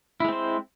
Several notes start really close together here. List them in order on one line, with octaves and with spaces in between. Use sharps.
E4 G#3 C4 C5